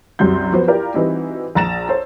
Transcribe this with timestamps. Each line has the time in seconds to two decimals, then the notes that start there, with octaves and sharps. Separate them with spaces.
0.19 C2 F#2 C3 F#3 C6 G6
0.52 F3 B3 F#4 C5
0.67 E4 F4 G4 A#4 D5
0.94 E3 G3 C4 D#4 E4 F#4
1.55 A#1 A#5 A6 E7
1.89 A4 C5 C#5